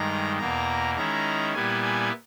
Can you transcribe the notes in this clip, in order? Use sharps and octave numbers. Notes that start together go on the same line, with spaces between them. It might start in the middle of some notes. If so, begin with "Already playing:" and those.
Already playing: G2 D#3 G#3 A#5
E2 B2 A#3 A#5
D#3 G#3 C#4 E4 A#5
A#2 G3 B3 E4 G#5
G#5